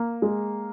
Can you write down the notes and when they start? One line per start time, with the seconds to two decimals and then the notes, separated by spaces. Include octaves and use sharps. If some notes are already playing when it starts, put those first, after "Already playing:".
Already playing: A#3
0.22 G#3